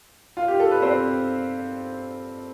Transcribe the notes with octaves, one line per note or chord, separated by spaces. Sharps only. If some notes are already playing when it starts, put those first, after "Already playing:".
F4
G4
A4
B4
C4 C5